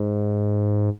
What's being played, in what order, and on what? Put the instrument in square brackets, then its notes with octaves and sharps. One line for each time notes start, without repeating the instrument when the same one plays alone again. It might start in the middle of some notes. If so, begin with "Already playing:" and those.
Already playing: [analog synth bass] G#2